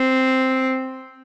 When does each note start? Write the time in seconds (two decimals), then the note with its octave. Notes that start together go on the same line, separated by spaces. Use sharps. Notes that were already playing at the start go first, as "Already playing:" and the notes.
Already playing: C4